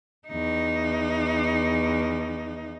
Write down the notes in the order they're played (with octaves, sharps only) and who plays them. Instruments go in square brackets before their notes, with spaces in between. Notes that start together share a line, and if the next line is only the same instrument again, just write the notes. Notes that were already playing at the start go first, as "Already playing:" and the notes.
[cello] E2 D#4